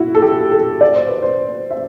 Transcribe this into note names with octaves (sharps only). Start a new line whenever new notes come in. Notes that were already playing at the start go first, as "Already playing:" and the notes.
Already playing: E4 F#4
A4
G4
A4
D5
C5
B4
C5
E5